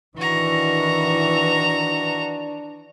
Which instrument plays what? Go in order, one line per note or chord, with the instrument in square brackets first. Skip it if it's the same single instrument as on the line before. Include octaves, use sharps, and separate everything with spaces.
[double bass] D#3 E3 [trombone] D4 [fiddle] F#4 A#5